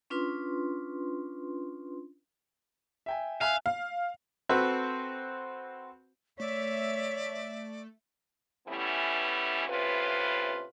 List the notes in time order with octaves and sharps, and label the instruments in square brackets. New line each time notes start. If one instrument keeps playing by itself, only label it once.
[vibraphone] C#4 D4 F4 B4 C6
[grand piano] E5 G5 G#5
[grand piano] E5 G#5 F#6 [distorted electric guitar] F5
[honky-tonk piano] F5
[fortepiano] C4 F#4 A4 B4
[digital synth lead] A3 [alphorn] C#5 [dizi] D5 [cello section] E5
[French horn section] E3 G3 A3 B3 C#4 E4
A2 C3 C#4 F4 B4